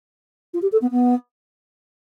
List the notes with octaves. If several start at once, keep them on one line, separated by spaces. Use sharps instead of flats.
F4
G4
A4
B3
B3